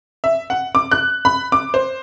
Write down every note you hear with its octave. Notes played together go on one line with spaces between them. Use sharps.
E5
F#5
D6
F#6
B5
D6
C5